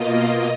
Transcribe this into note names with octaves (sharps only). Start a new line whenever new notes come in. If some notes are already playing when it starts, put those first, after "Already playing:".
Already playing: B2 A#3 F4 D#5